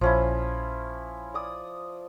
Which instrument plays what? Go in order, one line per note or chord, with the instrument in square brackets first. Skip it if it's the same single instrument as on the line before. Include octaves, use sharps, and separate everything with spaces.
[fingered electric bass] A#1 [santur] F3 C#4 E4
[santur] D5 D#6